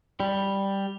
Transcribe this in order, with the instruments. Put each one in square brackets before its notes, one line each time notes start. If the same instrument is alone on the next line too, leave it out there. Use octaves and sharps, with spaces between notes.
[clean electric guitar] G3